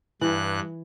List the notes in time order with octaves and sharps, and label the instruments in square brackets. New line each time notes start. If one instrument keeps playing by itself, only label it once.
[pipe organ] G2 F#6 [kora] E3